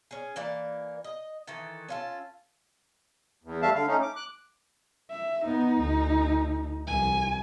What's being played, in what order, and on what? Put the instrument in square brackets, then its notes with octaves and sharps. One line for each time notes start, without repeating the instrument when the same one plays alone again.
[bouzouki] C#4 G#4
E3 A#3 A#4 D5
D#5
D#3 E3 A4
C#4 F4 A4
[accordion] E2
G3 A3 E5 F5 A5
D3 F5
A3 C#4 D#4
D6
D6 F#6
[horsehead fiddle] E5
[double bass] B3 [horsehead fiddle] D#4
[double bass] D2
[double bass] C2 [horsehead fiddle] G#5